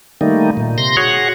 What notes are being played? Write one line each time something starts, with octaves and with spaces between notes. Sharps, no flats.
D#3 G3 A3 A#3 D#4
A#2
C3 C6 A#6
F#4 G#4 C#5 F#5